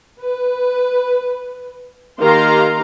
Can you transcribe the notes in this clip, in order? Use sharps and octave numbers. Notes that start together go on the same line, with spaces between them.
B4
D#3 A#3 G4 F5 A#5 C6